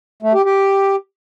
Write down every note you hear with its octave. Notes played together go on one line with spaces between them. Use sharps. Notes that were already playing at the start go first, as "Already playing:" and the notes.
A3
G4
G4